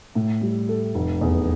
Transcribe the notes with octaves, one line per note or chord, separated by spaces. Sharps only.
A2
G3
A4
F1
E2